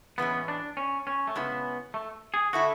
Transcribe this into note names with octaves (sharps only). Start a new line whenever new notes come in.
A2 E3 G#3 B3 C#4
D4
C#4
C#4
A3
C#3 G#3 B3 C#4 E4
A3
G#4
D3 A3 E4 F#4